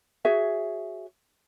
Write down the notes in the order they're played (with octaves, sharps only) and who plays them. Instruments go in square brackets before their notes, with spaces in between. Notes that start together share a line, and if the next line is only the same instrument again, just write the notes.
[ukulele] F#4 G#4 C#5 E5